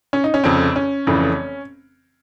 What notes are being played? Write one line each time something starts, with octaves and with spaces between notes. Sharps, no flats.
C#4
D#4
C#4
F1 F2 C#3 C4
C#4
F1 F2 C#3 E3